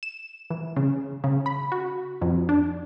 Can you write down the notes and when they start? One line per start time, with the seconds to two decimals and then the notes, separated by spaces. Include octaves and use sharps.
0.03 E7
0.50 E3
0.76 C#3
1.24 C#3
1.46 B5
1.72 F#4
2.22 F2
2.49 D4